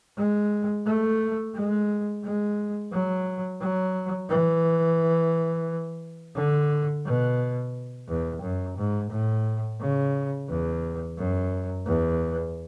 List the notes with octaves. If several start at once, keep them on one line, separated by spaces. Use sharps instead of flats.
G#3
A3
G#3
G#3
F#3
F#3
E3
D3
B2
E2
F#2
G#2
A2
C#3
E2
F#2
E2